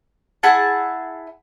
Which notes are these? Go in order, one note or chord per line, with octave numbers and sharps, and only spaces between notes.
E4 G#4 F#5 A5